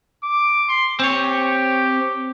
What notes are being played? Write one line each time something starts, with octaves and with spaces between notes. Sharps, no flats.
D6
C6
C4 G4 C#5